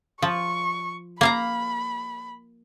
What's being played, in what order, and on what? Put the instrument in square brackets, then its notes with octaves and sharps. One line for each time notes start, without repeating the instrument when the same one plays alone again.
[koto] F3 [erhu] C#6
[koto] A#3 F5 A#5 [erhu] B5